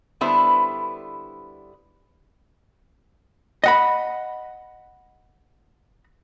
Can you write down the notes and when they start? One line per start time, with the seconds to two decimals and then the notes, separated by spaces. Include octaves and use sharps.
0.21 D3 G3 B3 E4 B4 C5
3.64 D#5 F#5 B5